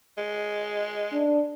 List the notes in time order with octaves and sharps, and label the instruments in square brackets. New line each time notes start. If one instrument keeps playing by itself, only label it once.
[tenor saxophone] G#3
[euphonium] D4